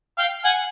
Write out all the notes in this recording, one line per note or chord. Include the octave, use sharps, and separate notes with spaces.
F5 G5
F#5 G#5